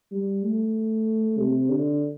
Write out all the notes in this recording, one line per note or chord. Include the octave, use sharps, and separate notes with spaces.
G3
A3
C3
D3